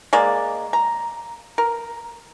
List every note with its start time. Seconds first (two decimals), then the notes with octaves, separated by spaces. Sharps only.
0.13 G#3 A#3 D5
0.73 A#5
1.58 A#4